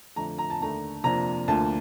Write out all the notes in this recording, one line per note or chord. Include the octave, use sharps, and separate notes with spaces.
F2 D3 A3 A#5
A#5
A5
D#2 D3 A3 A#5
F2 C3 F3 A#3 D4 A#5
D2 D3 F3 A#3 A5